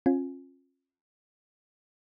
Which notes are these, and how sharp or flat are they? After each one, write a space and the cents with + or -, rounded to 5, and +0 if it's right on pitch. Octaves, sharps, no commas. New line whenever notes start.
C#4 -40 F4 +20 G#5 +0